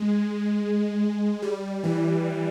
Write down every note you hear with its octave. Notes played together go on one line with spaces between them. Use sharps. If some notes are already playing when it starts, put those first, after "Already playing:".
Already playing: G#3
G3
E3